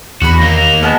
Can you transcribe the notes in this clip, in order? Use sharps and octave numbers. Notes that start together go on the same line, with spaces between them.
E2 F#4 B5
D#2 A#3 A#6
F7
G#3 B3 A5 F6